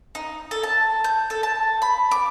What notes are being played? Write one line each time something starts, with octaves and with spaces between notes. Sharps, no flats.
D#4
A4
A5
G6
A4
A5
B5
D6